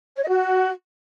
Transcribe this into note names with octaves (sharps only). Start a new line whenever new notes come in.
C#5
D#5
F#4